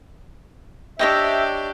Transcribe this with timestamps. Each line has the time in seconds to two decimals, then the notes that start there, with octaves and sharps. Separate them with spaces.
0.99 D4 G4 C#5 D#5 E5 G5